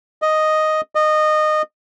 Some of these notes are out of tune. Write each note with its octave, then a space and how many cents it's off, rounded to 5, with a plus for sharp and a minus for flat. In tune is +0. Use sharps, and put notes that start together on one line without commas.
D#5 +0
D#5 -20